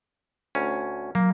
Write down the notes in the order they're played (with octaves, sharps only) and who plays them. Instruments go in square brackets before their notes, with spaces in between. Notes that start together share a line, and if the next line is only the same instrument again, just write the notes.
[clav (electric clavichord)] D2 C#4
[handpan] F#3 [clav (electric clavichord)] A#3